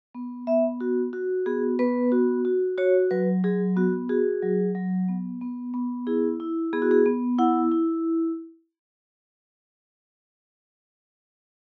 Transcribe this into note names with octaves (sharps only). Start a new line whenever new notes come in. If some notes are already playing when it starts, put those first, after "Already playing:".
B3
B3 E5
F#4
F#4
B3 G#4
B3 B4
F#4
F#4
F#4 C#5
F#3 B4
F#3 G#4
B3 F#4
F#4 G#4
F#3
F#3
B3
B3
B3
E4 G#4
E4
B3 G#4
F#4
G#4
B3
E4 F#5
E4